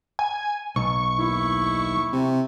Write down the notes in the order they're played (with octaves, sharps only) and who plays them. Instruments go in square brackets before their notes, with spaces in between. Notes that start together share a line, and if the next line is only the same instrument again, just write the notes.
[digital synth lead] G#5
[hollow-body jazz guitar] B1 [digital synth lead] C#6
[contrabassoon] D#2 [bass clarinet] E4
[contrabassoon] C3